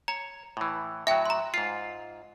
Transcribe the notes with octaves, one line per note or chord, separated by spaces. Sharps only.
C#5 A#5
A2 E3
A2 F#3 E5 G5
A#5 C6
G#2 F4 C7